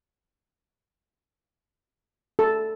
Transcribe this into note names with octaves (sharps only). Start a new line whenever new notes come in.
A4